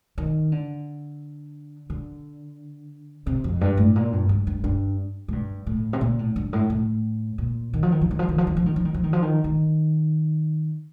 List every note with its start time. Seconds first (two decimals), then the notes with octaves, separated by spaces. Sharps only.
0.18 D#3
0.52 D3
1.90 D3
3.26 C3
3.44 F2
3.61 G2
3.77 A2
3.96 A#2
4.13 G2
4.29 G2
4.47 G2
4.64 G2
5.28 A2
5.32 G2
5.67 A2
5.93 C3
6.01 A#2
6.19 A2
6.36 G2
6.53 A2
6.70 A2
7.38 A#2
7.73 D#3
7.83 F3
7.92 D#3
8.01 F3
8.11 D#3
8.19 F3
8.29 D#3
8.38 F3
8.47 D#3
8.57 F3
8.66 D#3
8.76 F3
8.85 D#3
8.94 F3
9.04 D#3
9.13 F3
9.22 D#3
9.44 D#3